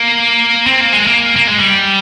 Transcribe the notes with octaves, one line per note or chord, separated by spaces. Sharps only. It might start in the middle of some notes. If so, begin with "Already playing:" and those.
Already playing: A#3
C4
A#3
G#3
A#3
A#3
G#3
G3